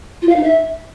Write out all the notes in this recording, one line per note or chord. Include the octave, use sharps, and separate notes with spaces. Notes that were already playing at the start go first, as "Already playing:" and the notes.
F4
F5
D#4
E5